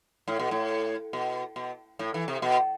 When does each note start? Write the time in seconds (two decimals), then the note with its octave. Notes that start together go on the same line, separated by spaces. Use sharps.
0.28 A2
0.39 B2
0.51 A2
1.13 B2
1.56 B2
1.99 A2
2.14 E3
2.28 C3
2.42 B2